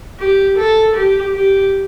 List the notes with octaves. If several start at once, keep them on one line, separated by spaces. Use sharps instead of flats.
G4
A4
G4
G4